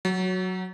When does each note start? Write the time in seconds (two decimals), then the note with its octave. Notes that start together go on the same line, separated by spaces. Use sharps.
0.05 F#3